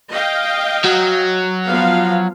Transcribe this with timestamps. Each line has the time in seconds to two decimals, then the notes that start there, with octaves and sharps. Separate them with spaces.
0.11 D#5 F5 G5
0.85 F#3
1.68 F3 B3 F5